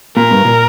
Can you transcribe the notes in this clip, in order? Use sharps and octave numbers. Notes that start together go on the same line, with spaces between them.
A#2 A#4
G2
A#2